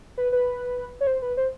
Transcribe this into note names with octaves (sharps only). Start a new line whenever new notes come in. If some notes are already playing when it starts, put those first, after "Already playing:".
B4
B4
C#5
C5
B4
C5